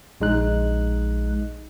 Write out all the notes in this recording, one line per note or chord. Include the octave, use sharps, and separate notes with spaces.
A#1 G#3 D#4 F#6